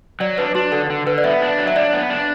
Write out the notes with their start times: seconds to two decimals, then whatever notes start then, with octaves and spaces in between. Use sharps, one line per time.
0.20 F#3 D5
0.38 D4 B4
0.55 D4 F#4
0.72 D3 A4
0.90 D3
1.07 D3 B4
1.18 D5
1.24 B3 E5
1.42 D4
1.58 F#3
1.67 E5
1.76 D4 D5
1.93 B3
2.10 D4